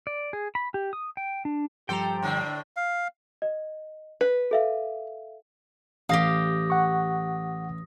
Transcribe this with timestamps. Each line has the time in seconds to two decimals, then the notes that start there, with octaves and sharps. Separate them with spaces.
0.07 D5
0.33 G#4
0.55 B5
0.74 G4
0.93 D#6
1.17 G5
1.45 D4
1.89 G2 F3 G3 G4 A4 C5 G5 A#5
2.22 A2 D3 D4
2.77 F5
3.42 D#5
4.21 B4
4.51 A4 E5 F5
6.09 A1 G4 F5 D#6 A#6
6.70 F#5 C#6